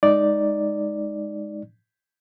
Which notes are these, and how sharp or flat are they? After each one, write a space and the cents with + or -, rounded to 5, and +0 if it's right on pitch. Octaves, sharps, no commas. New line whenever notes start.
G#3 +0 D#4 +0 D5 +0